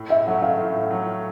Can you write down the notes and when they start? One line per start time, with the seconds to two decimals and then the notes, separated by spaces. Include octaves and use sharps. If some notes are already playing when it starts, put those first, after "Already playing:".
Already playing: A2
0.10 E5
0.26 F#3 A3 C#4 F#5
0.43 F5
0.59 A2
0.91 F#3 A3 C#4